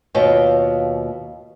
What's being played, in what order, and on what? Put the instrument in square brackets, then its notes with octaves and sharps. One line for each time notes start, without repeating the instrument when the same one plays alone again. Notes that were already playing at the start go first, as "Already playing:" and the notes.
[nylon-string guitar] D#2 B2 F4 C#5 G5